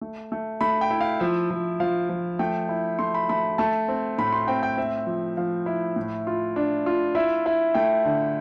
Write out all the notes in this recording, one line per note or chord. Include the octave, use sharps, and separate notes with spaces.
A3
A3
A3 B5
G5
E4
F5
F3 E5
F3
F3 F5
F3
A3 G5
E4
A3 C6
B5
A3 B5
A3 A5
C4
A2 B5
C6
C4 G5
G5
C4 E5
F3
F3 F5
E4
A2
F4
D4
F4
E4 E5
E4
A3 G5
D3